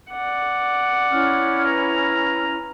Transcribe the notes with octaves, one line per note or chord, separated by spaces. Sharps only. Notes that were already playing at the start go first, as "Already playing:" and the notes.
D5 F#5
C#4 E4 F6
B4 A#5